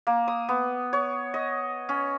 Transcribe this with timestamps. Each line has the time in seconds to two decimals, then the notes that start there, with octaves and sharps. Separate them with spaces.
0.07 A#3
0.28 D#6
0.49 B3
0.93 C#5
1.34 D#5
1.89 C#4